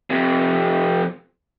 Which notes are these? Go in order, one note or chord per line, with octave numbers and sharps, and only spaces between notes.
F2 C3